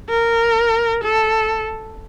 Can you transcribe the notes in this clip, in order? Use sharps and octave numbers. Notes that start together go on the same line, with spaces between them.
A#4
A4